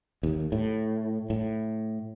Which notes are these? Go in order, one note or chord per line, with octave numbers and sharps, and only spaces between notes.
D#2
A2
A2